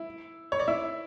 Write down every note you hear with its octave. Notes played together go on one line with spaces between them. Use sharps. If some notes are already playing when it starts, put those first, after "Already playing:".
Already playing: E4
C#5
D5
E4 E5